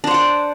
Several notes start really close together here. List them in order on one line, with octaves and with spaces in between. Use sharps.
D4 C5 F#5 D5